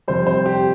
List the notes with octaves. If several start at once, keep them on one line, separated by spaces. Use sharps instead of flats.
F2 C3 G3 C5
C5
G4